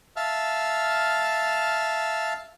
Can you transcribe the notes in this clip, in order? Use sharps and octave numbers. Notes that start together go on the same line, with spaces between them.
E5 F5 A5 F6